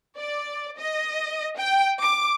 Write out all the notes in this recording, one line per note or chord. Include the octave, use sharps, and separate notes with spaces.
D5
D#5
G5
D6